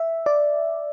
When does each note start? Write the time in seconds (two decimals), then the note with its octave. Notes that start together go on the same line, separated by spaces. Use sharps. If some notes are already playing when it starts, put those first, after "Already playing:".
Already playing: E5
0.26 D5